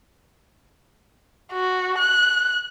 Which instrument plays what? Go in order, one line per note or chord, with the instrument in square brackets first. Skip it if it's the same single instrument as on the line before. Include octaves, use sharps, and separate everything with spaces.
[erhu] F#4
F#6